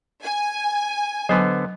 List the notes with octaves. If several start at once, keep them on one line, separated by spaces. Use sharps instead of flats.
G#5
D3 F#3 B3 C5